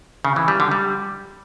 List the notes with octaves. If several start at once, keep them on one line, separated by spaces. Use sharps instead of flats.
C#3
E3
G3
D3
G3